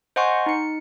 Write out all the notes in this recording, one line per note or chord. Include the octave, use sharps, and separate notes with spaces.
C5 D#5 F#5 G#5 C6 C#6
D#4 C#7